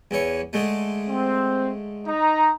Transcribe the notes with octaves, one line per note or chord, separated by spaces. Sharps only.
E2 E3 C#5
D3 G#3 A3
C4
D#4 A#5